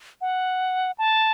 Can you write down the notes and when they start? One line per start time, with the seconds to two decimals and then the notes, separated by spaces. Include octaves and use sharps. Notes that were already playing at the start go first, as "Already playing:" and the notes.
0.21 F#5
0.98 A5